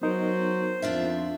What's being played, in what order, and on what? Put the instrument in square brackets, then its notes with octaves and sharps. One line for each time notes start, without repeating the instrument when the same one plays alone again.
[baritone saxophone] F#3 [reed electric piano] B3 D#4 A#4 [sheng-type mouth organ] C5
[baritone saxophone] F2 [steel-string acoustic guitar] D4 F4 E5